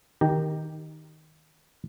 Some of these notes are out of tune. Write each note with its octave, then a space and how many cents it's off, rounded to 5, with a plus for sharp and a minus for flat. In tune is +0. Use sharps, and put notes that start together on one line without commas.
D#3 +0 G4 +0 A#5 -10